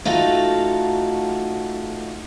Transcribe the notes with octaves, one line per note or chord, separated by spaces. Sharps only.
A3 D#4 F4 F#4 A4